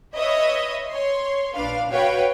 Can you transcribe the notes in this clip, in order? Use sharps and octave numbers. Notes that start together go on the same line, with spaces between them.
B4 C#5 D#5 E5 D#6
C#5 C6
A#1 D4 B4 F5
F#4 B4 C#5 F5 G5